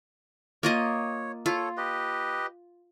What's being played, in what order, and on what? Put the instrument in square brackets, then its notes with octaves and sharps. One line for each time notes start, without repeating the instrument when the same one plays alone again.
[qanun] A#3 F4 D#5 [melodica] C#5
[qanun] F4 [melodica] A4 C#5
[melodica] G4 B4 D#5